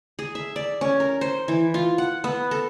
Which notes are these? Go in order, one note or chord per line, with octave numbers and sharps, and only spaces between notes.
G#4
E5
D5
C#4
A#4
C5
E3
F4
F#5
B3
A4